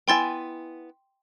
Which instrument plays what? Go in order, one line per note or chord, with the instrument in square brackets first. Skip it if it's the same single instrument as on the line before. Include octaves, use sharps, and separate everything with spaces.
[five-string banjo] B3 E4 G#5 [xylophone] G5 C6 A6